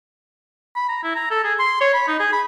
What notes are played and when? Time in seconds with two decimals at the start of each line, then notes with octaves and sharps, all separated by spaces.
0.76 B5
0.89 A#5
1.04 E4
1.15 A#5
1.31 A4
1.44 G#4
1.59 C6
1.81 C#5
1.93 B5
2.08 D#4
2.20 G#4
2.33 B5